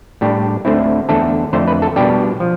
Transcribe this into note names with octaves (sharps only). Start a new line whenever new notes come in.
A2 G3 D4 G4
D2 D3 A3 C4 E4
E2 D3 A3 D4 A4
F2 D3 A3 C5
B4
A4
B2 G3 D4 G4
F3